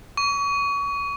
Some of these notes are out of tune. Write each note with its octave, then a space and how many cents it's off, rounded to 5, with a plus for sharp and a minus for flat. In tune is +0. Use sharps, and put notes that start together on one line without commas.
C#6 +30